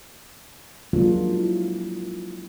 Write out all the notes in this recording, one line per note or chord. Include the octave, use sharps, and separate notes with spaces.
F3 F#3 G#3 A#3 D4 F4
E4